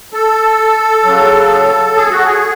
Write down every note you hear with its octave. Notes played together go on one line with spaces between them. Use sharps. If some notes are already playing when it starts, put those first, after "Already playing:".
A4
C#3 F#3
G#4
F#4
G#4